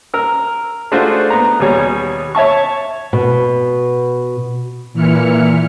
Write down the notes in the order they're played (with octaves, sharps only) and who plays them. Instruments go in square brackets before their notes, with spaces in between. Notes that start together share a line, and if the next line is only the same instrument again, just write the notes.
[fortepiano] A#4 E6
G#3 A3 D4 F4 F#4 C5
B3 A#5
D#2 B2 G3 G#4 C#5
C#5 E5 A5 C#6
[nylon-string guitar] B2
[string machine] A#2 E3 E4 F6 C#7